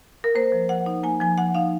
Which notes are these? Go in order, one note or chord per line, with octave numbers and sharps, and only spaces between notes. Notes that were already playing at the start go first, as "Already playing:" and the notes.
A#4
A#3 C5
F3
F3 F#5
D#4
A#3 G#5
F3 G#5
F3 F#5
D#4 F5